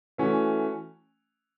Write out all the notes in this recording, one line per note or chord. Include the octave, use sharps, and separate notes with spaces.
E3 A3 C#4 F#4